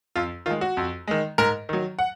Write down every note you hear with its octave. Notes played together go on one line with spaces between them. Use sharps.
F2 F4
D#3 G#3 F4
F#4
F2
D#3 G#3
G#2 A#4
D#3 F#3
F#5